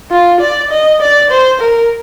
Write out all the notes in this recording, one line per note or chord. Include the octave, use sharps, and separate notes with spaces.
F4
D5
D#5
D5
C5
A#4